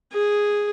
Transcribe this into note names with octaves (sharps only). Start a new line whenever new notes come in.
G#4